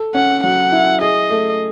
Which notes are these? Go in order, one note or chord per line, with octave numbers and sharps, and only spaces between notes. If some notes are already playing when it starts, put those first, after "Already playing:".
Already playing: A4
C#4 F#5
F#3 F#5
E4
G#4 D#5
A3